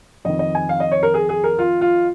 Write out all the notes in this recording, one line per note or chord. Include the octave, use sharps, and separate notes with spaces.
F2 D#3 D#5
D#5
G#5
F5
D#5
C#5
A#4
G#4
G#4
A#4
F4
F4